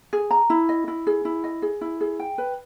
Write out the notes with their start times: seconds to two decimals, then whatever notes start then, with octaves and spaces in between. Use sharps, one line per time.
0.13 G#4
0.31 A#5
0.50 E4
0.69 D#5
0.88 E4
1.07 G#4
1.25 E4
1.44 D#5
1.62 G#4
1.81 E4
2.01 G#4
2.19 G5
2.38 B4